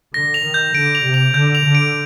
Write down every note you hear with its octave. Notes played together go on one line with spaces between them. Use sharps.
D3 A#6
F7
D#3
G6
D3 D7
F7
C3
F7
D3 G6
F7
D3
D7